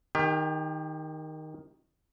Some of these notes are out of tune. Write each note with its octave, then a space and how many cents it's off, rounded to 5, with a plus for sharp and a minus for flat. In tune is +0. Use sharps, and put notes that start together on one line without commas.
D#3 +0 G4 +35